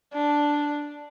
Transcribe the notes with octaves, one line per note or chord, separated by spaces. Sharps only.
D4